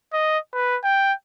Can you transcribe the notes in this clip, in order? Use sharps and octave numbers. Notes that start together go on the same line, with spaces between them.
D#5
B4
G5